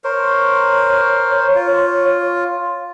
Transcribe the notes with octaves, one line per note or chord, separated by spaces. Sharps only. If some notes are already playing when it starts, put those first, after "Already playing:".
A#4 C5 C#5
F4